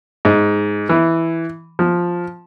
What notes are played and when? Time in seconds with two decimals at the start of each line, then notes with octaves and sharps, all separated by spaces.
0.25 G#2
0.89 E3
1.79 F3